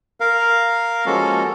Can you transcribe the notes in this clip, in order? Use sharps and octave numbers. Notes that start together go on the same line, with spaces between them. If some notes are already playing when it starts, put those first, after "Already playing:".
A#4 F5
F3 G#3 A#3 C#4 F#4 A4